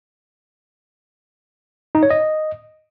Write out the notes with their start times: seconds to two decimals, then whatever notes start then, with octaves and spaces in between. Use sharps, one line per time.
1.95 D#4
2.03 C#5
2.10 D#5